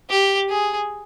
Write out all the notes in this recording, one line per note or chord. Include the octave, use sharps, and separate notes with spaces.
G4
G#4